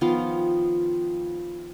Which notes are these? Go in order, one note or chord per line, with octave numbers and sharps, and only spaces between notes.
D#3 F3 B3 F4